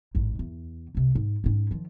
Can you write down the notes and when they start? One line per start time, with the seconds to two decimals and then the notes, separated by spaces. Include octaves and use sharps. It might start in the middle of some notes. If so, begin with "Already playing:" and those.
0.15 A1 G#2
0.39 E2
0.95 C2 C3
1.15 G#2
1.44 G#2 C#4
1.71 D#3 F3